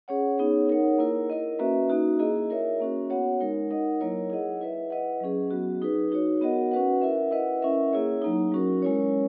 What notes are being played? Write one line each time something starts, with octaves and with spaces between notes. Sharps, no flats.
C#4 G#4 C#5 F#5
B3 D#4 G#4 C#5
D#4 A#4 C#5 F#5
A#3 E4 A#4
E4 A#4 D#5
A#3 C#4 F#4 B4 E5
A#3 D#4 F#4
A#3 E4 G#4 D#5
E4 A#4 C#5 E5
A#3 C#4 F#4
B3 F#4 C#5 F#5
G#3 D#4 A#4
D#4 A#4 D#5 F#5
F#3 A#3 E4 A#4 C#5
E4 G#4 D#5 F#5
E4 B4 E5
E4 B4 D#5 F#5
F#3 C#4 G#4
F#3 B3 F#4
D#4 G#4 B4
D#4 F#4 C#5
B3 F#4 A#4 D#5 F#5
C#4 F#4 B4 F#5
E4 A#4 E5
E4 B4 D#5 F#5
C#4 E4 A#4 E5
A#3 E4 G#4 C#5
F#3 A#3 D#4
F#3 C#4 F#4 A#4
G#3 C#4 E4 A#4 C#5